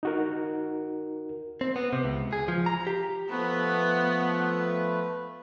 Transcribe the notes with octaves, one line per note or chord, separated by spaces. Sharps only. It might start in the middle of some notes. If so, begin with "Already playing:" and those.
D#4 F#4 A#4
C4
B3
C3
C#2
G#4
F3
A#5
G4
F3 A3 B3 B4